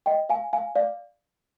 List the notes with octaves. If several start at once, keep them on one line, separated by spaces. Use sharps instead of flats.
D#5 G5
F5 G#5
F5 G#5
D5 F5